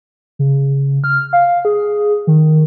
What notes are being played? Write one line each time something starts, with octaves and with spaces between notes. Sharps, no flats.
C#3
F6
F5
G#4
D#3